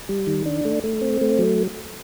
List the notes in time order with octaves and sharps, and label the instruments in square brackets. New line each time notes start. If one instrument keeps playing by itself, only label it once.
[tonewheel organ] G3
D#3
D4
A3
A3
C4
A3
F#3